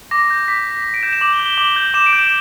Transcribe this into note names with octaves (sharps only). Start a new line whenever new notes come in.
D6 A#6
G6
D6 B6
G6
D6
D7
G6 E7
E7
D6 F#7
G7
G6
G7
D6 F#7
G6
D6 E7
D7
G6
E7